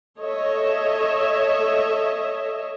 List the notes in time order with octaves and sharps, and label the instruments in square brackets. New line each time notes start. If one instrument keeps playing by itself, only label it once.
[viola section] A4 C#5 D#5 E5